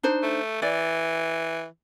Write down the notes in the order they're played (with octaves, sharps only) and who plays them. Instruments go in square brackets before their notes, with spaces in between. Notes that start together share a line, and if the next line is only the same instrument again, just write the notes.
[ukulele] D4 D#4 C5
[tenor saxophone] A3
[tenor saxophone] E3 [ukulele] D5